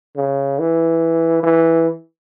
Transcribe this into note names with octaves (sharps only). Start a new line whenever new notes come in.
C#3
E3
E3